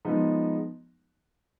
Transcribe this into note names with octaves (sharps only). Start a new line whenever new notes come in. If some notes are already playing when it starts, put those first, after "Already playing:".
F3 G#3 B3 D#4